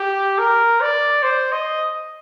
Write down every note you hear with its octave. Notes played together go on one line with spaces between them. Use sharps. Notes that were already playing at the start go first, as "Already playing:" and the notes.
Already playing: G4
A#4
D5
C5
D#5